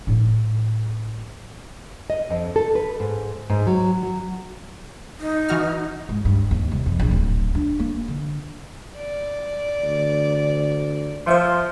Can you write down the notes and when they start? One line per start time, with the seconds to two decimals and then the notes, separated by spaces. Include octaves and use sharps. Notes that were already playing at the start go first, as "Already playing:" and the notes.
0.07 A2 D#4
2.10 D#5
2.30 F2
2.56 A4
2.75 B4
3.00 G#2
3.50 G#2
3.67 F#3
4.03 F#3
5.20 D#4
5.49 E3 F#4 F6
6.09 G#2
6.25 G2
6.51 D#2
6.71 C2
6.86 F2
6.99 A#1
7.11 D1
7.55 D4
7.80 A#3
8.08 D3
8.96 D5
9.84 D2
11.26 F3 C5 E5 C6